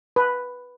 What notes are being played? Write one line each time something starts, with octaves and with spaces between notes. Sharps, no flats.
B4